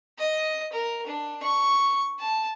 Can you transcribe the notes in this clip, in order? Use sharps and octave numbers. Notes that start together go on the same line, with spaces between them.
D#5
A#4
D4
C#6
A5